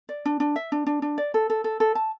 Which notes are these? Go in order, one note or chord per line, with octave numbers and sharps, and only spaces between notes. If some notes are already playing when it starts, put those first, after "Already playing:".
D5
D4
D4
E5
D4
D4
D4
D5
A4
A4
A4
A4
A5